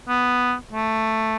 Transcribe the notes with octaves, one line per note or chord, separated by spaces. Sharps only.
B3
A3